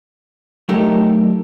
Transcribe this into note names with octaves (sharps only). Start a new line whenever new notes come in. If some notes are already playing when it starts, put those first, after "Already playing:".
F#3 A3 D#4 G4 A4 A#4